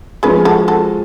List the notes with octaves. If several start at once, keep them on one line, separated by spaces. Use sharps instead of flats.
F3 G#3 C#4 G#4 B4
F#4 A4
F#4 A4